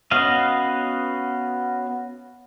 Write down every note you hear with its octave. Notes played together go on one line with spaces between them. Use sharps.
B3 C#4 F#4 D#5 F5